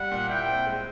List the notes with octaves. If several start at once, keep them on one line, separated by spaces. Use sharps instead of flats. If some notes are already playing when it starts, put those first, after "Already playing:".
Already playing: G3 F#5
A#2
E4 G5
C4
G#3